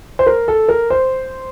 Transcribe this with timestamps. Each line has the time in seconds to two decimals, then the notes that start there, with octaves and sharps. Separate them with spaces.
0.19 C5
0.26 A#4
0.48 A4
0.68 A#4
0.90 C5